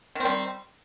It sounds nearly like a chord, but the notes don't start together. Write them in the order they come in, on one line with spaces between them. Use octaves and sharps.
D#3 C4 G3